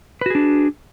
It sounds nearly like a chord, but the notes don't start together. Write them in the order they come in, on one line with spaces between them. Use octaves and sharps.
B4 F#4 G#4 D4